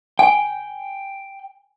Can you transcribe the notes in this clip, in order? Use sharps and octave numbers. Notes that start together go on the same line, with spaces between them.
G5 G#5